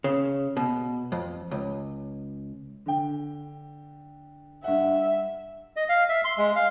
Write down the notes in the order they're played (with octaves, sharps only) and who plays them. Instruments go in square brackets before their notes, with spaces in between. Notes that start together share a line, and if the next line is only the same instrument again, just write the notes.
[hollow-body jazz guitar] C#3
B2
F2
C#2
[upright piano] D3 G5
[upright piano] G2 F#5 [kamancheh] E5
[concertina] D#5
F5
E5
C6
G#3
F5